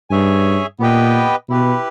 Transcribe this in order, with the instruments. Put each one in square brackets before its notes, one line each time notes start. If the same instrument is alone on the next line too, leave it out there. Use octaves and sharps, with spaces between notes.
[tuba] G2 [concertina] C#4 G#4 C#5 E5 G#5
[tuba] A#2 [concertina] B3 G4 B4 D#5 G5
[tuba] B2 [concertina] E4 G4 B4